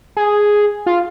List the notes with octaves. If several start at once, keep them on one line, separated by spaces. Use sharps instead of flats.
G#4
F4